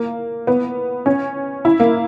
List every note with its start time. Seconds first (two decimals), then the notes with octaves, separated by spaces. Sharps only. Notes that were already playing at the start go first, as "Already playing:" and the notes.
Already playing: A#3
0.47 B3
1.06 C#4
1.65 E4
1.80 A#3